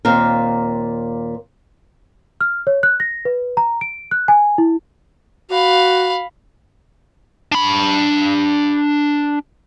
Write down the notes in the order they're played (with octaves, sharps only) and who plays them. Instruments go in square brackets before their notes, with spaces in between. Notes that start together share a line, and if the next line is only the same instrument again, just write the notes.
[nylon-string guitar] D#2 A#2 C4 A#4
[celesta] F6
C#5
F#6
A#6
B4
A#5
D7
F#6
G#5
E4
[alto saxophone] F#4 [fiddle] F5 B5
[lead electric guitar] D4 B5